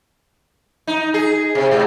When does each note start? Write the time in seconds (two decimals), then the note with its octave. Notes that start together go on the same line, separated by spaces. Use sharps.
0.87 D#4
1.14 G#4
1.55 C3
1.71 G#2